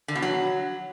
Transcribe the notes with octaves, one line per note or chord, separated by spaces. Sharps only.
D3
B2
F#3